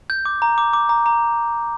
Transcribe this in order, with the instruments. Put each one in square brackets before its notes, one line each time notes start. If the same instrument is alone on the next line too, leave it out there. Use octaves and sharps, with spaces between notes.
[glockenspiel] G6
D6
A#5
D6
D6
A#5
A#5